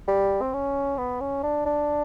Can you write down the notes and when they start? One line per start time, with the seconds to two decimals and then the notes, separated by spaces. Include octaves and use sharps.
0.08 G3
0.42 C4
0.54 C#4
0.98 B3
1.21 C#4
1.43 D4
1.66 D4